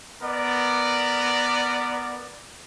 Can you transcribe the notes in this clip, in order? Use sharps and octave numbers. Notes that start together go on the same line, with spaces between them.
B3 A#4 D5